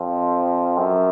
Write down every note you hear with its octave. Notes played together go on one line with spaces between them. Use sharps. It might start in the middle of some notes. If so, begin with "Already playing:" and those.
Already playing: F2
F#2